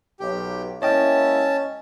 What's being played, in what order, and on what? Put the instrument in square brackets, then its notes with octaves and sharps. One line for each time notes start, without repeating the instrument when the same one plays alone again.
[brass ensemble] B1 [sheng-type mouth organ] G4
[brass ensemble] G#3 A#3 E4 [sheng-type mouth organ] C#4 A5 [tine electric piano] C#5 D#5 G5